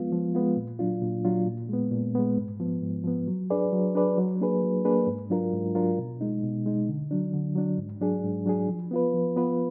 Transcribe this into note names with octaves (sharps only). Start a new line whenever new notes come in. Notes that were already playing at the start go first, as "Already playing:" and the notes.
Already playing: F3 G#3 B3 F4
F3
G#3 B3 F4
A#2
F#3 D4 F4
A#2
F#3 D4 F4
A#2
G#3 B3
A#2
G#3 B3
G#2
F3 B3
G#2
F3 B3
F#3
D4 G#4 B4 D5
F#3
D4 G#4 B4 D5
F#3
A#3 D4 G#4 B4
F#3
A#3 D4 G#4 B4
G#2
F#3 D4 F4 A#4
G#2
F#3 D4 F4 A#4
B2
G#3 D#4
B2
G#3 D#4
D3
F#3 D4
D3
F#3 D4
G#2
F#3 D4 G#4
G#2
F#3 D4 G#4
F3
B3 F4 B4
F3
B3 F4 B4